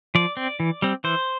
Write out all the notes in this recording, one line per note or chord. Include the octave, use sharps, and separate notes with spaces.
F3 D5
C4
E3
G3 C4
E3 C5